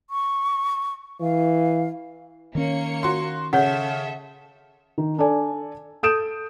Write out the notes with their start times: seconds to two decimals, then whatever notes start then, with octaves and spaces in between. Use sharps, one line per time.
0.10 C#6
1.21 E3 F5
2.55 D#3 A#3 C#4 C#5 C#7
3.03 F#4 C6
3.53 C#3 A4 C#5 E5 F#5
4.98 D#3
5.18 D4 A4 D5 G#5
6.03 A4 D#6 G6 D7 E7